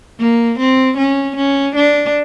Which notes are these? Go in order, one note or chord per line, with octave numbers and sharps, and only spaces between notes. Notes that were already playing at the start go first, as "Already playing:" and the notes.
A#3
C4
C#4
C#4
D4